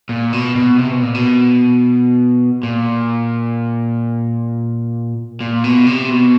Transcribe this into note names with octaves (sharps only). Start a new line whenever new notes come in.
A#2
B2
B2
C3
B2
A#2
B2
A#2
A#2
B2
C3
B2